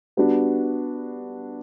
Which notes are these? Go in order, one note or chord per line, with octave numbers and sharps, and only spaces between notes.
G3 B3 D4 F#4